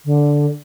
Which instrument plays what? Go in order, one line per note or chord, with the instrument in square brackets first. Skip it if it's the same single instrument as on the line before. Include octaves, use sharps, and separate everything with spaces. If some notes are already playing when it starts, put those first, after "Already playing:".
[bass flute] D3